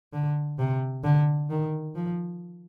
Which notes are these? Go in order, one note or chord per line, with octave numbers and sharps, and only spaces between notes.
D3
C3
D3
D#3
F3